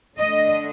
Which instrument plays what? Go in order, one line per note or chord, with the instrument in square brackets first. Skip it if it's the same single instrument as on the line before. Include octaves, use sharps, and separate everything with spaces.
[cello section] D3 A3 D4 D#5